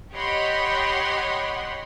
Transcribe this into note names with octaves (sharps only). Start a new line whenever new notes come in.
G4 C#5 D#5 F#5 B5 C6